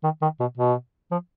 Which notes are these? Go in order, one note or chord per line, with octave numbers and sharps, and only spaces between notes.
D#3
D#3
B2
B2
F3